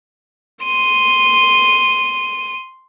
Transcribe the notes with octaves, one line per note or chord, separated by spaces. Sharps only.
C6 D#7